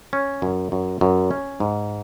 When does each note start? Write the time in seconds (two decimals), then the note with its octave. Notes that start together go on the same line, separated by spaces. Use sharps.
0.13 C#4
0.42 F#2
0.72 F#2
1.01 F#2
1.31 C#4
1.60 G#2